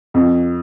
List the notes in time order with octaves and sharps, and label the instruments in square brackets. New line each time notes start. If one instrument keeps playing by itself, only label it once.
[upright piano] F2